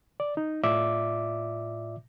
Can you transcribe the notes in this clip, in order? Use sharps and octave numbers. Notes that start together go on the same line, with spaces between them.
D5
D#4
A2 F4 D5 E5 D6